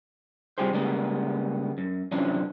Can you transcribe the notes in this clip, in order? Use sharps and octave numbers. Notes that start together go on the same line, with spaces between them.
C3 G3 F4 G4 G#4 C5
C#3 G3 G#3 A#3 B3
F#2
F#2 C3 E3 F3 C#4 D4